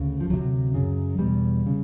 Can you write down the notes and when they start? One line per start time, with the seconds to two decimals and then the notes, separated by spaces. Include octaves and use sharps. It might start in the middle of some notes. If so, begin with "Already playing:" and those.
Already playing: D2 C#3
0.20 F3
0.30 D2 C3 F#3
0.74 F#2 C#3
1.18 E2 B2 G3
1.66 C#3